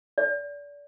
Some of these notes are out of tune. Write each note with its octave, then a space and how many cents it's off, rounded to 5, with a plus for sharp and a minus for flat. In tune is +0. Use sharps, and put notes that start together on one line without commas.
D5 -30